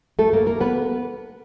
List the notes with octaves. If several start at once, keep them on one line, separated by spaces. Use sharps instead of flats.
A3 A4
A#3 A#4
A#3 A#4
B3 B4